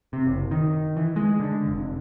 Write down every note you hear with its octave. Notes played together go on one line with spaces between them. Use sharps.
C3
F#1
D#3
E3
G#3
D3
F1